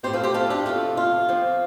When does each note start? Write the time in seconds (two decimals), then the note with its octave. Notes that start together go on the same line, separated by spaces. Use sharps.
0.03 A2 A3 C4 G4 C5
0.13 F4 A4
0.23 G4 C5
0.34 F4 A4
0.50 D4 G4
0.66 F2 C3 A3 F4 A4
0.97 F4
1.28 F2 F3 C4